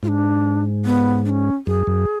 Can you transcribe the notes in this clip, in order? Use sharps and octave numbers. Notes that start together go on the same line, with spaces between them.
G#2 F4
D4
B3
D4
C#4
F#2 G#4
F#2